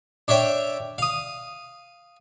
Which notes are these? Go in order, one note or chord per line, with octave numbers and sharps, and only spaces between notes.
D4 C#5 E5 G5
F5 D#6